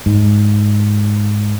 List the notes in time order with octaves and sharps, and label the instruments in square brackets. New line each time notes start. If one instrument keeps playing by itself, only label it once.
[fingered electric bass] G#2